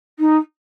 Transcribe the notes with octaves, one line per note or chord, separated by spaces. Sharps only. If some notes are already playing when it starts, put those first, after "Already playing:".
D#4